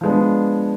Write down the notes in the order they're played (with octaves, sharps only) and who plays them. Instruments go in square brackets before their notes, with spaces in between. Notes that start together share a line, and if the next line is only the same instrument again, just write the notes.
[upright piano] F3 G#3 B3 D4